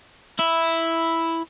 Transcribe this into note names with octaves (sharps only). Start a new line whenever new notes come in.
E4